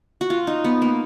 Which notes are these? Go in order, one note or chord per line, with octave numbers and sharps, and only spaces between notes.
F#4
F4
D#4
B3
A#3